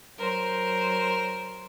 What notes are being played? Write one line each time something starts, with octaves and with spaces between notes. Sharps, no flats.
F#3 A#4 C5